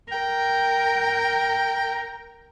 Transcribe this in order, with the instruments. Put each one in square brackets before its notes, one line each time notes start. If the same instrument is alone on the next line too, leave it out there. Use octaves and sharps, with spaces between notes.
[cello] A#4 [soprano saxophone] G5